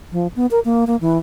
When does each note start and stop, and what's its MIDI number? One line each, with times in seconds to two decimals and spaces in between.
0.12 0.27 53
0.36 0.46 59
0.51 0.59 70
0.65 0.85 58
0.87 0.96 58
1.01 1.18 52